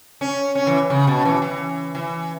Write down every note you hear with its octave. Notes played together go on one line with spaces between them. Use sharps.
C#4
C#4
E3
C#3
B2
E3
E3
E3